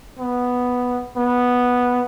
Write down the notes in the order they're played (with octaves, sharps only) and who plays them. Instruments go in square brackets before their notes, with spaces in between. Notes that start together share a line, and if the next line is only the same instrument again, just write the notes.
[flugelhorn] B3
B3